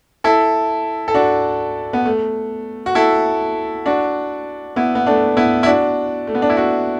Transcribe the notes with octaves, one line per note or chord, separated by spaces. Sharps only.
E4 A4
A4
D4 F#4
B3
A3
F#4
E4 A4
D4 F#4
B3 E4
B3
A3 D4
B3 E4
E4
D4 F#4
A3
B3
D4
E4
D4 F#4